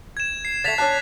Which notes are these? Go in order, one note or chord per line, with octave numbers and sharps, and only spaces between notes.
G#6 E7
C7
D3 A3 A6 B6 F7
C#4 D4 A5 F#6